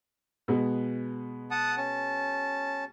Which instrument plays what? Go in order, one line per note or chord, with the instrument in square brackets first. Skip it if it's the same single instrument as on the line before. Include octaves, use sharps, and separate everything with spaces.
[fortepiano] B2 G#3 B3
[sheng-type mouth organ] F#5 A5 D#6
C#4 A5